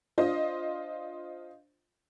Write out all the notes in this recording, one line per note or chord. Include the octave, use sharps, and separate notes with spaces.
D4 F4 C5 D#5